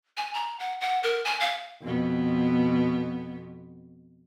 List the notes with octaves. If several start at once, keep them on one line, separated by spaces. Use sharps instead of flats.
G#5
A#5
F#5
F#5
A#4
G#5
F5
F2 B2 B3